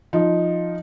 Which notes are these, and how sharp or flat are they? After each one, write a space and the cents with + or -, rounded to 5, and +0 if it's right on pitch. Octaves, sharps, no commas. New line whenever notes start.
F3 +0 D#4 +0